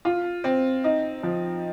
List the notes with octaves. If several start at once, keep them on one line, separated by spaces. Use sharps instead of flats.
F4
C4
D#4
F3